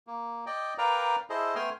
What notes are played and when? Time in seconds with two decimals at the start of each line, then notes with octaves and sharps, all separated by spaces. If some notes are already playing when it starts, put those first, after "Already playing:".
0.07 A#3
0.46 D5 D#5 G5
0.78 A#4 B4 D5 F5 G5 A#5
1.30 E4 G#4 A4 C5 D#5
1.55 A3 B3 G5 G#5 C6 F6